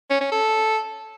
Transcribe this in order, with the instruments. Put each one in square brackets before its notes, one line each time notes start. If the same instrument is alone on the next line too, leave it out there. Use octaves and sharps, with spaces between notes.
[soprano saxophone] C#4
C#4
A4